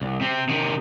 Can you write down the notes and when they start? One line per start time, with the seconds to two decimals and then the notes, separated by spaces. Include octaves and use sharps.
0.02 C2
0.21 C3 C4
0.49 C3 D#3